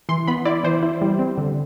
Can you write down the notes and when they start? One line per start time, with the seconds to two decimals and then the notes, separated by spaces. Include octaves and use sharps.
0.09 E3 C6
0.28 B3 B5
0.45 E4 D5
0.64 E3 C5
0.83 E4
1.02 G3
1.19 C4
1.38 D3